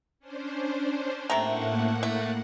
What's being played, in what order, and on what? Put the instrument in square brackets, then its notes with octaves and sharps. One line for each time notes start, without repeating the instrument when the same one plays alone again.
[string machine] C#4 D4 C5
[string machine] A2 A#3 F#5 [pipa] C3 A3 A#5
[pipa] A3